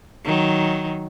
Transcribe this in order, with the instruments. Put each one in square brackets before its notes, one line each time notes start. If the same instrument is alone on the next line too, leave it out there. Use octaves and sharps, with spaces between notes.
[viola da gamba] D#3 F#3